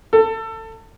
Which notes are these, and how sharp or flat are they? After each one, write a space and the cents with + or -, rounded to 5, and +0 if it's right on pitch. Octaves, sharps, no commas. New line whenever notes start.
A4 +25